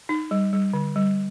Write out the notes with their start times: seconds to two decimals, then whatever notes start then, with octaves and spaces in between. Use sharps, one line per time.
0.09 D#4
0.31 G3
0.53 G3
0.73 D3
0.96 G3